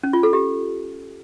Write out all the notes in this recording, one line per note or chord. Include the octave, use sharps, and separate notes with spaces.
C#4
F4
A4
G4